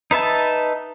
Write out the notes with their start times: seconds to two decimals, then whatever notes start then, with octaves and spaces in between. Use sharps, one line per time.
0.11 D#4 B4 E5 A5